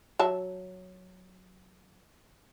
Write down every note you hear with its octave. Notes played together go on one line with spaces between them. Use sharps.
F#3 E5 A5